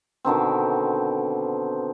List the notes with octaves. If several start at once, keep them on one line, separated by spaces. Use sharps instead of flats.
B2 D3 D#3 C4